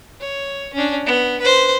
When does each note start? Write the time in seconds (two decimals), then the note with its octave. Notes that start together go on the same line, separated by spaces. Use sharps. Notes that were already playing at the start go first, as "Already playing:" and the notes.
0.20 C#5
0.74 C#4 D4
1.06 B3
1.41 B4 C5